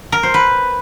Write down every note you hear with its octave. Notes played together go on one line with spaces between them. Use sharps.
A#4
C5
B4